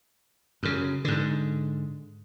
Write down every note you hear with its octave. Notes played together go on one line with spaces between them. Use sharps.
F#2 C#3
G#2 D3